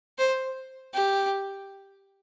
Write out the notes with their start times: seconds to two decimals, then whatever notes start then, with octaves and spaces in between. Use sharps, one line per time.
0.18 C5
0.94 G4